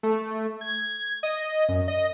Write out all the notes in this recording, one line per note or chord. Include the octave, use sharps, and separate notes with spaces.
A3
G#6
D#5
F#2
D#5